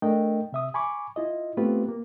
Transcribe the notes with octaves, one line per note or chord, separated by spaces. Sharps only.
A3 D4 A#4 D#5 G5
C3 E5 D#6
G#5 B5 C#6 D6
E4 F4 D#5
A3 B3 C4 F4 G4 B4
A#3